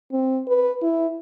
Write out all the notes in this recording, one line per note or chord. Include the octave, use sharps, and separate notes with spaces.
C4
B4
E4